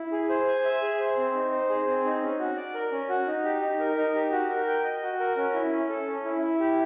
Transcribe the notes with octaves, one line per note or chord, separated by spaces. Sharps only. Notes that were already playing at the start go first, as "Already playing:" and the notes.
Already playing: E4
G#4
C5
G#5
E5
G#4
C5
C4
D#4
C5
G#4
C4
D#4
C#4
F#4
D5
A#4
C#4
F#4
D#4
G4
D#4
A#4
D#4
G4
F#4
A#4
G5
D#5
F#4
A#4
C#4
E4
C#4
A4
C#4
E4
E4
G4